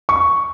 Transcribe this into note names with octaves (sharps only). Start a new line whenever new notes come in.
C#6